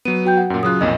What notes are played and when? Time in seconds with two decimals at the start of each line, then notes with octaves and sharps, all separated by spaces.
0.05 F#3 B3 D#7
0.25 F#4 G5 G6
0.38 F#5
0.50 F#2 A#2
0.63 C#3 F#3 F4 D#6 F#6
0.81 B1 F2 A#2 D#5